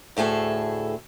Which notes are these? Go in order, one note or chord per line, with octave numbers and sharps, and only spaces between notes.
D2 A2 A3 G#4 A4